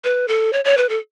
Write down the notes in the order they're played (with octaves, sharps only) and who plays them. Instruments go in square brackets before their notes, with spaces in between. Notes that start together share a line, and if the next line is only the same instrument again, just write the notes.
[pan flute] B4
A4
C#5
C#5
B4
A4